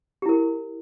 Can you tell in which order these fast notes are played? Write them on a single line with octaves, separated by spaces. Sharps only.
G4 E4 A#4